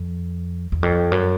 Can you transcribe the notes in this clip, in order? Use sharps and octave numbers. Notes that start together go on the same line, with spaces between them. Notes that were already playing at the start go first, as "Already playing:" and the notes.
Already playing: F2
E2
F2
F#2